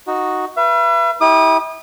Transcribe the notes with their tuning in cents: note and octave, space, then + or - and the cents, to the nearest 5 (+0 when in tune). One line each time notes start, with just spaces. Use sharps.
D#4 +0 F#4 +0
B4 -20 E5 +40
E4 -35 G4 +0 D#6 -30